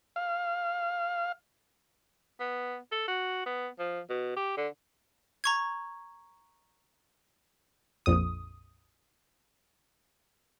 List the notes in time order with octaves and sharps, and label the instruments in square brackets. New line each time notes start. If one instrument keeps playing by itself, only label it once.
[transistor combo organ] F5
[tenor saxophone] B3
A4
F#4
B3
F3
B2
G4
D3
[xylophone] A#5 C#6 G#6
[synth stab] A#1 F2 D#6